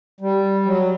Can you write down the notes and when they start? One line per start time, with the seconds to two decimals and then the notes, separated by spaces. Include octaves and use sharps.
0.21 G3
0.66 F#3